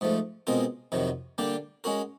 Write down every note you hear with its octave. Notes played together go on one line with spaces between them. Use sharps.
G#2 F3 A3
B2 G#3 C4 F4 A#4
F2 C3 D#3 F#3
D3 G3 A#3 D4 G4
G#3 C#4 F#4 A#4